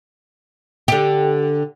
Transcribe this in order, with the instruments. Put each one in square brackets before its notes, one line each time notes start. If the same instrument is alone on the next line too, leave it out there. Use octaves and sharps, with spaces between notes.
[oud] D3 G4